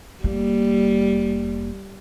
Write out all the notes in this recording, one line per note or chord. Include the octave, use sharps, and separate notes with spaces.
F1 G3 A#3